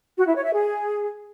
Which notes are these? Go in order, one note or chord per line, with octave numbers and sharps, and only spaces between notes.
F#4
E4
C#5
E5
G#4